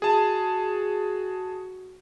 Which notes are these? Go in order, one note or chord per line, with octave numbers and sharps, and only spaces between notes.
F#4 G#4 A5